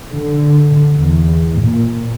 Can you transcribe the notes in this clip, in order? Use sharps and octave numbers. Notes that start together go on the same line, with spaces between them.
D3
E2
A#2